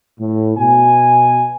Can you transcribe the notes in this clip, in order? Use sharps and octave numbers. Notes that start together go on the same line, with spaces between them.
A2
B2 G#5